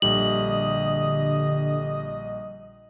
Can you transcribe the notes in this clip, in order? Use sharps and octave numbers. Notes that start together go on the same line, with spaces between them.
A#1 D3 G3 D#5 F#7